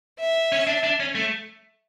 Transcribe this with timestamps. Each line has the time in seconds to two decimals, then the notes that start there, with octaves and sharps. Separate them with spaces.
0.20 E5
0.52 C#4
0.67 D4
0.83 D4
1.00 C#4
1.15 A3